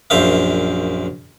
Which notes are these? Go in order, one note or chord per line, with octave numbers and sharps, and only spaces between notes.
A#1 F#2 C5 E5 F5